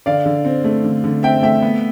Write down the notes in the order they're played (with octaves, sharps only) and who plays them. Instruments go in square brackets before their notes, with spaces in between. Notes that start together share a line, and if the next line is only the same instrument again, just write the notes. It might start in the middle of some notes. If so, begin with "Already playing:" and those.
[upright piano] D3 D5 F5
D3
C4
A3
D3
D3
C4 E5 G5
A3 E5 G5
B3